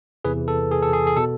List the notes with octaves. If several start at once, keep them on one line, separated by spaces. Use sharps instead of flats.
E2 C3 E3 G#4 B4
A4
G#4
A4
G#4
G#4
B2 A4